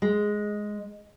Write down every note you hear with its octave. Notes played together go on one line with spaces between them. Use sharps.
G#3